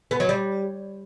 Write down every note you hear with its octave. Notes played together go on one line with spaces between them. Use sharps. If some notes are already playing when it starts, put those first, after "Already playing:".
B3
F#3
G3